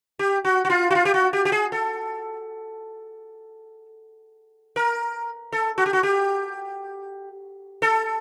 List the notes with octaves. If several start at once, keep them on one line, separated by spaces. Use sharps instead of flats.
G4
F#4
F#4
F4
F#4
F4
G4
F#4
G4
G4
G#4
A4
A#4
A4
F#4
G4
F#4
G4
A4